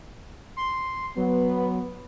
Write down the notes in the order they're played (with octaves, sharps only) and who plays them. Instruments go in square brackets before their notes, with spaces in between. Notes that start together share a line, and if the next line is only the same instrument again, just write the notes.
[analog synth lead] C6
[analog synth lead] F#3 [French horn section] B3